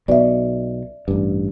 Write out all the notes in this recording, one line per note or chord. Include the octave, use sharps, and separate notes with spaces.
B1 B2 D5 E5
A1 G2